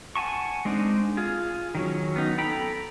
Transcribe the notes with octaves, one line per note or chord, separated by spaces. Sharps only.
F#5 G#5 A5 C#6
G#3 C4 D4 D#4
F4 G#4
D#3 F#3 C#4
B3 D#4
A4 G5 A#5 B5